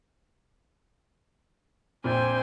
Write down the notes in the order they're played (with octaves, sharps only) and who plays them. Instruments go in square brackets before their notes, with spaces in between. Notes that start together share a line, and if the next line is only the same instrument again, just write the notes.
[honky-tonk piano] A#1 F2 A#2 [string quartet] C5 G5 G#5